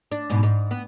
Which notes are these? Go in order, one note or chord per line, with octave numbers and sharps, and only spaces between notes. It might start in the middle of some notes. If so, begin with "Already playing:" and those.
D4
G#2 B2
G#2
B3